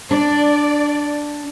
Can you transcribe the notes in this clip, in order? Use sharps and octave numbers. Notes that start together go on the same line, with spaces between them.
D4 D5